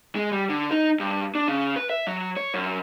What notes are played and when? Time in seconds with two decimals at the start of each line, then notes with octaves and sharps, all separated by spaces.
0.15 G#3
0.32 G3
0.49 D3
0.71 D#4
1.00 G2
1.35 D4
1.48 C#3
1.76 B4
1.89 E5
2.07 F#3
2.37 C#5
2.54 F#2